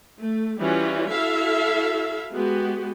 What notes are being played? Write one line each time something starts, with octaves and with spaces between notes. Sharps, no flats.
A3
E3 G3 C#4 F4 F#4
E4 F#4 A4 E5 F5
G#3 B3 F#4 G4